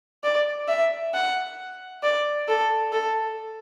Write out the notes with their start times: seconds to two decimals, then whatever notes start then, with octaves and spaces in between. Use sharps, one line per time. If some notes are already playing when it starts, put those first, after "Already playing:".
0.24 D5
0.68 E5
1.14 F#5
2.03 D5
2.48 A4
2.92 A4